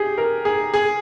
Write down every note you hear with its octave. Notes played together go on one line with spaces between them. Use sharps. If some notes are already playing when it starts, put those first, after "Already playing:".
Already playing: G4 G#4
A#4
G#4
G#4